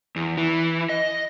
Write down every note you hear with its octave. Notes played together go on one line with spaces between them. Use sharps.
E2
E3
D#5